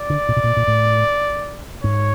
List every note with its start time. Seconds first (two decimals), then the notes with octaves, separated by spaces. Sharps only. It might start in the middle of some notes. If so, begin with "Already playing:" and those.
Already playing: D5
0.10 D3
0.29 A#2
0.37 B2
0.44 A#2
0.57 A#2
0.68 A2
1.84 G#2 C#5